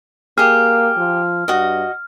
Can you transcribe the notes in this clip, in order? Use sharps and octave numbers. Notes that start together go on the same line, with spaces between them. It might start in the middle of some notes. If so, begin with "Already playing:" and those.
A#3 G4 G#4 F6
F3
G2 F#4 D#5